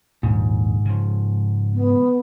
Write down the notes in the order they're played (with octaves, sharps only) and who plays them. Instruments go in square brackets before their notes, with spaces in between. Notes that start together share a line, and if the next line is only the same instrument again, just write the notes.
[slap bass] A#1 D#2 [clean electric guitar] G#2
[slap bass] C#3 F3
[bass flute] B3